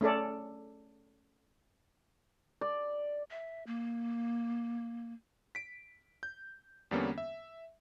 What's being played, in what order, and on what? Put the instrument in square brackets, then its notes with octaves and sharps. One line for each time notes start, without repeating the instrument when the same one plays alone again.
[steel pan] A3 C#4 A4 D5
[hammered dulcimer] D5
[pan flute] E5
A#3
[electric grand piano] B6 D7
G6
E2 D3 G3 A#3 B3 C#4
E5